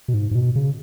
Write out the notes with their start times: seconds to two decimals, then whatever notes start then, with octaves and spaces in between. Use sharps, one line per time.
0.08 B2
0.14 G#2
0.31 G#2
0.35 B2
0.56 C#3